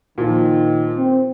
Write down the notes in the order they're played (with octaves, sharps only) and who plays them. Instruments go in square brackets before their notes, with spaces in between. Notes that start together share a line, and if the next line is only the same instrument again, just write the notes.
[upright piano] A#2 F3 [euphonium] D#3
[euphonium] C4